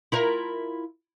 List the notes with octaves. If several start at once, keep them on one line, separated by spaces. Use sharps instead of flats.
E4 F4 A#4